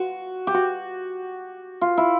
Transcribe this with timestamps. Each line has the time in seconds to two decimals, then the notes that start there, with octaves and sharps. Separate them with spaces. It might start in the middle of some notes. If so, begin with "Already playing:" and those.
Already playing: F#4
0.47 G4
0.54 F#4
1.81 F4
1.97 E4